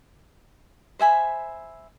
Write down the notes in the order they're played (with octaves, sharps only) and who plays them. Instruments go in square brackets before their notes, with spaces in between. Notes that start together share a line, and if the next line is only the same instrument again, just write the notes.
[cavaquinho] C5 E5 G#5 B5